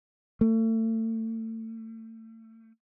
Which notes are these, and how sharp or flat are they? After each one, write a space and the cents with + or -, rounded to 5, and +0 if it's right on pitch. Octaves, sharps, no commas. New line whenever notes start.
A3 +35